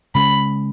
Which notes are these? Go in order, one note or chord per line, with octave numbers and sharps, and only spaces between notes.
C#3 G#3 C#4 B5